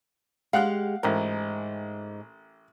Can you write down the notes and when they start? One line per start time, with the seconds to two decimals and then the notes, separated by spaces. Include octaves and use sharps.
0.53 G#3 G4 F5 F#5 F#6
1.03 A1 G#2 A#4